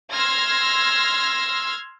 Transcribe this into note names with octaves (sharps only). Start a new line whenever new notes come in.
C6 E6 F6 G#6 A#6